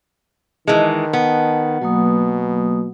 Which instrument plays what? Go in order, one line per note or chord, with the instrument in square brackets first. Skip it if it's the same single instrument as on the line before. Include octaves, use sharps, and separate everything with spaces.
[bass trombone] D#3 [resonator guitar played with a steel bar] E3 G#3 [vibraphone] D#5 A5
[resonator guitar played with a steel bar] B3
[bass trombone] B2 [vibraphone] F#3 A#3 D#6